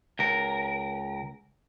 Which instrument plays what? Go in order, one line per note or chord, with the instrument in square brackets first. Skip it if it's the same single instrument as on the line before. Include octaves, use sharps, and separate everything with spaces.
[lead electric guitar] C#2 A#4